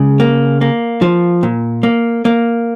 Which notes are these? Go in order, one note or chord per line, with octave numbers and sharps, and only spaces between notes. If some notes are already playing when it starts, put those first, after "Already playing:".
Already playing: C#3 G#3
A#3
A#3
F3
A#2
A#3
A#3